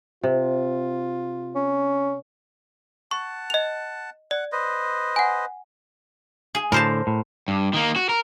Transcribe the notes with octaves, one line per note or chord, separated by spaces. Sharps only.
C3 F4
C#4
F#5 A5 C#6
D#5 F7
D5 F#5
B4 C5 D#5
F#5 G#5
G#4
A2 D3 A#4 C5 A5
A2
G2
D#3 A#3
F#4
A#4